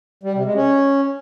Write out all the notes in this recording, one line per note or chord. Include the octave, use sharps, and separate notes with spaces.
G3
C3
G#3
C#4